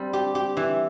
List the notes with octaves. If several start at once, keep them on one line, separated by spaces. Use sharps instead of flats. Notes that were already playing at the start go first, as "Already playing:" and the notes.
Already playing: G3 C4
G4
G4
E3